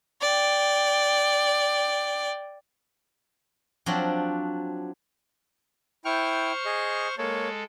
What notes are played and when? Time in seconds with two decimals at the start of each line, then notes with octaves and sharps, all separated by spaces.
0.21 D5 G5
3.86 F3 F#3 C4 D4 F#4 D5
6.05 E4 C5 G5 C#6 F6
6.65 G#4 D#5
7.18 G#3 A#3 A4 C#5